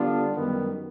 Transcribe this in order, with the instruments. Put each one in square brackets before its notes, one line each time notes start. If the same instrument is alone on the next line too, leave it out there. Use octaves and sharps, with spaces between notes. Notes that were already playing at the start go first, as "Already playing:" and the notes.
Already playing: [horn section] D3 G3 B3 D4 F4
F#2 D#3 G3 B3